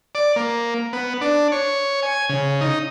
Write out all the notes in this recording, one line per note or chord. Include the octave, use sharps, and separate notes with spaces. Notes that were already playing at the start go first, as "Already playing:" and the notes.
D5
A#3
B3
D4
C#5
G#5
C#3
D#4